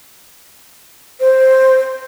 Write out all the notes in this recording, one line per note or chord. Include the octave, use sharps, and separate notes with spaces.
C5